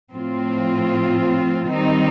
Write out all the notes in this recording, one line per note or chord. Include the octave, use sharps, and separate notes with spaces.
A2 F3 C4 F4
D#3 G3 C4 D#4